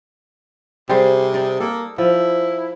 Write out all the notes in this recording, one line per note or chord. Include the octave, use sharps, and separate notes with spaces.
C3 G3 G#4 C5
D#4 D5
A#3 A4
F3 E4